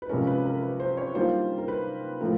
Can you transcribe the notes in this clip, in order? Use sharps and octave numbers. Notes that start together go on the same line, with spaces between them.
B4
C3 F3 G#3 C#4 A#4
B4
A#4
B4
C5
C#5
D#3 G3 A#3 D4 F4 C5
A#4
B4
A2 F3 A3 A#4